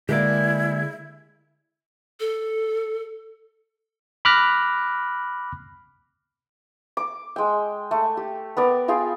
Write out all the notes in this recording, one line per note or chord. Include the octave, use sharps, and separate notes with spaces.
D3 G#3 A#3 E4 G4 A#4 D5
A4
B5 D6 F6 F#6 A#6
D6
G#3 G5
A3
G4
B3 A#4 D5
F4 G#4 F5 G5